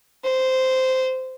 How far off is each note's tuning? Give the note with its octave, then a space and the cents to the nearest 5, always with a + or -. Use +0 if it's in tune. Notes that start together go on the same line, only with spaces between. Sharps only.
C5 -10